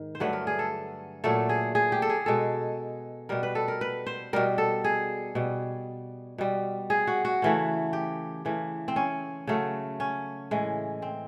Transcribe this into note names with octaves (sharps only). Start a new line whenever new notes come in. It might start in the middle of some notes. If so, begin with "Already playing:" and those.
Already playing: G#2 D#3
C5
G2 D3 F#3 A3 B4
A#4
G#4
A4
A#2 F#3 A3 A4
G#4
G#4
G4
A4
G#4
B2 G#3 A4
B2 G3 A#4
B4
A4
A#4
B4
C5
B2 G3 A#4
A4
G#4
B2 G3
B2 G3
G#4
F#4
F#4
C#3 E3 A3
G4
C#3 E3 A3
C4
C#4
C#3 F#3 A3
C#4
A2 E3 G#3
C4